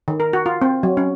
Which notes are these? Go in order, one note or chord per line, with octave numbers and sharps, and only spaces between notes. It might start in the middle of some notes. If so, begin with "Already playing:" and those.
D#3
A#4
F#4
F4
C4
F#3
C#4